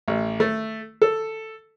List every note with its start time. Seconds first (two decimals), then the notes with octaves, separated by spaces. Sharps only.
0.08 A1
0.40 A3
1.02 A4